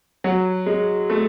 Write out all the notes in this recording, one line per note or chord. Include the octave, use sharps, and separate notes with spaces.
F#3
G#3
A3